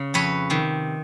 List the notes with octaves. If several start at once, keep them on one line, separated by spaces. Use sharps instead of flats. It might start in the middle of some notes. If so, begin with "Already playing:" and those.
Already playing: C#3
F2 B4 C#5
C3 D#3